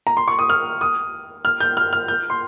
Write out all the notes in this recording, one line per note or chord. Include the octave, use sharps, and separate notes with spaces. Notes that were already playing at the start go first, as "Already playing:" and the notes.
A#5
C6
C#6
D#6
F6
D#6
F6
G6
F6
F6
G6
C6